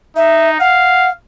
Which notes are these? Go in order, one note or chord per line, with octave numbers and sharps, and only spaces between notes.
D#4 E5
F5 F#5